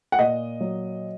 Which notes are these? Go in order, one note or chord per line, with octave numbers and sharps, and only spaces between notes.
F#5
A#2 D#5
F#3